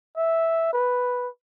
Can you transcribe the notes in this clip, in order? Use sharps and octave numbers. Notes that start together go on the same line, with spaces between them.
E5
B4